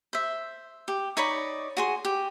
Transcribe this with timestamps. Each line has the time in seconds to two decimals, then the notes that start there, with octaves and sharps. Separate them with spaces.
0.13 C5 E5
0.88 G4
1.17 D#4 C#5 D5 B5
1.77 F#4 G#4 C6
2.05 G4